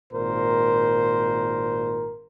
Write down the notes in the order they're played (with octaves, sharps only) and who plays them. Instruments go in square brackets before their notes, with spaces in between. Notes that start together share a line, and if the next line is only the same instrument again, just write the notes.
[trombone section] G#1 A#2 A#4 C5